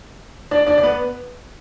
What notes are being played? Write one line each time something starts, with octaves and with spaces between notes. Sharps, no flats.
D4 D5
D4 D5
D5
B3 B4